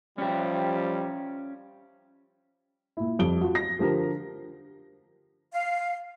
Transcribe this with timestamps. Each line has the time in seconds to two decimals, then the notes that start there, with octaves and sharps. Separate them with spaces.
0.18 F3 G3 C#4 G4
2.97 A#2 E4
3.19 F2 G3 D7 G7
3.41 F4 F#4
3.55 A#6
3.79 D3 F3 G4 A#4
5.53 F5